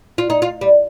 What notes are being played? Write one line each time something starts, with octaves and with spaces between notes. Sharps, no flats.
F4
D#4
F4
G3